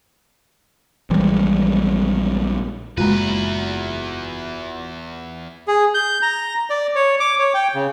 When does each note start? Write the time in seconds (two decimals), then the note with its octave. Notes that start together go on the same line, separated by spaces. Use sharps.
1.10 A#1 E3 G3 G#3
2.98 F#1 E2 A#2 G#3 F4 F#4 B4 A#5
5.68 G#4
5.94 G6
6.22 A#5
6.70 D5
6.95 C#5
7.20 D6
7.39 C#5
7.54 G5
7.74 C#3